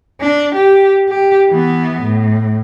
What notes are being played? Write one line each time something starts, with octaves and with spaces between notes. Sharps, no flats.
D4
G4
G4
E3 B3
A2